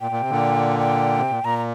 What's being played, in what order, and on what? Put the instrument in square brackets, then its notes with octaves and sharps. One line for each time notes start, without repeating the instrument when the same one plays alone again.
[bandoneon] A#2 [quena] G5
[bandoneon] A#2
C3
A#2 D3
[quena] G5
[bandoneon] C3
A#2
[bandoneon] A#2 [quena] A#5
[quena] A#5